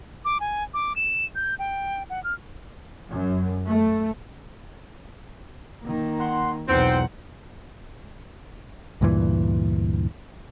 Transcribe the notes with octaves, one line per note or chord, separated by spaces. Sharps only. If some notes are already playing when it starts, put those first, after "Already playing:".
D6
G#5
D6
E7
G6
G5
F#5
F6
F#2
A3
D#3 A#3
F#5 C6
B1 E2 C4 D#4 F4 F#5
D2 G2 A#2 E3